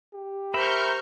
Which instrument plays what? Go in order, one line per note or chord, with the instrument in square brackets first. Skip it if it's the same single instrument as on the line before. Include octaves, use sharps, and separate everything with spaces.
[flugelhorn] G4
[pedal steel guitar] A#4 E5 B5 [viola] C5 A#5 [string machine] C#6 F6 G6